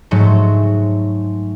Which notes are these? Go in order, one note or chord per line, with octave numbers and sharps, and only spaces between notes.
G#2 F#3 A3